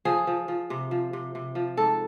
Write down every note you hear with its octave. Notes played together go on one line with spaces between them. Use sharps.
F3 G#4
F3
F3
C3
F3
C3
C3
F3
G#2 A4